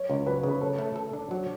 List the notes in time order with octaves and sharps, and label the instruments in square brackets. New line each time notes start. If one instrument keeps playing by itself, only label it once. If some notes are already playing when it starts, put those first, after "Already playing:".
Already playing: [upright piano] C#5
[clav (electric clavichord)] C#2
[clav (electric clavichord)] F#3 [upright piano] B4
[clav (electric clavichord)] C#3 [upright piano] B4
[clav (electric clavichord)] A4 [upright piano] C#5
[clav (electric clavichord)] A3
A4
D4
[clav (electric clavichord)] F#3 [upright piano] C#5